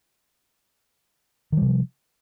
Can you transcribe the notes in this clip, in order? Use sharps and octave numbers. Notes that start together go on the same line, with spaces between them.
C3 D#3 F3 G3